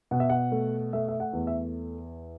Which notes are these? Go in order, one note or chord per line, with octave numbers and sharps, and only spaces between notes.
B2 F#5
E5
F#5
A3
A3 E5
E5
F#5
E2
E5